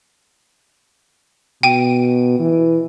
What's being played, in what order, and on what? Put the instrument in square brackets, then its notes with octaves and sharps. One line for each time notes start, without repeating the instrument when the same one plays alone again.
[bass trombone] B2 [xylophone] G5 D#7
[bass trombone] E3